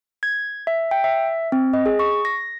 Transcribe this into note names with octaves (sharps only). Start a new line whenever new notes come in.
G#6
E5
G5
E5
C4
D#5
G#4
C#6
A#6